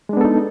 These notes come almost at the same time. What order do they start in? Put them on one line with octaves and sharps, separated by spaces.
G#3 D4 B3 A4 D#4